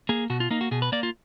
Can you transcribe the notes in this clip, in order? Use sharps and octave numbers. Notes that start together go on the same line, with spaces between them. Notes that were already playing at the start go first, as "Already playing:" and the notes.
A#3 G#4
B2 F#4
F4
A#3 D#4
F#4
B2 G#4
B4
A#3 D5
F4